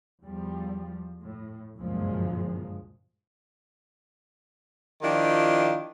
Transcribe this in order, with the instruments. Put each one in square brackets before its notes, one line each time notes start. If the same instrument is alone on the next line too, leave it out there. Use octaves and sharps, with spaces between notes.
[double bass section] E2 F3 G3
A2
G1 C#2 F#2 A#2 F3 G#3
[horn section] D#3 F3 D4 E4 F4 G4